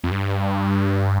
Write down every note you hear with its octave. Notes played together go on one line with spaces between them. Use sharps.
F2
G2